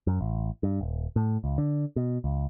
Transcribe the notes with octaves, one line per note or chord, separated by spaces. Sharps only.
F#2
A1
G2
D#1
A2
C#2
D3
B2
C#2